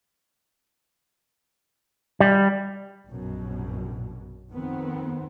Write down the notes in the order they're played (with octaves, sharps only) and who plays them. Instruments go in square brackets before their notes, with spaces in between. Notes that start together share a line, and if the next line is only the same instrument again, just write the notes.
[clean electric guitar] G3
[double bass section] A#1 F#2 B2
F2 D#3 B3 C4